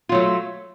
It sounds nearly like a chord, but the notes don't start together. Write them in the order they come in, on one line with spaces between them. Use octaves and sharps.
F4 F#3 A3